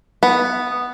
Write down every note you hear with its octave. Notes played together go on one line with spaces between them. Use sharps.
B3